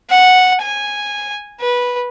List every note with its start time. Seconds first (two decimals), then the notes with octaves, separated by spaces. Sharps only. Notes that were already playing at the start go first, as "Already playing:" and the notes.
0.10 F#5
0.62 G#5
1.61 B4